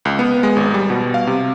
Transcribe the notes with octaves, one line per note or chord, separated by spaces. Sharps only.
C#2
B3
G#3
G#1
G3
B2
F5
C3